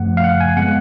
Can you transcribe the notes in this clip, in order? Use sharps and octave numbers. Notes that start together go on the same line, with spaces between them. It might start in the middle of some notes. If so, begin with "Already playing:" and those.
Already playing: F#2 F3 A3 F#5
F5
F#5
G#5
G#3 B3 F#5